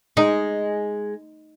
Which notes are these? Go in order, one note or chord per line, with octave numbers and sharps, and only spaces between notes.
G#3 D#4